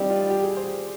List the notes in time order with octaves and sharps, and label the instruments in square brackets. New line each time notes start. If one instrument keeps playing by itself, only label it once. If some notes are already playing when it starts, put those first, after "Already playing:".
Already playing: [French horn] G3 [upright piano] C4 D4 D#4
[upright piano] F4
G4
G#4
C5